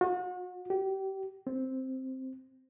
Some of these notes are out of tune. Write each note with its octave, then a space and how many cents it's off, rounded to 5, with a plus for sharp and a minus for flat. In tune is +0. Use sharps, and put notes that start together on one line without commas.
F#4 -40
G4 -30
C4 +0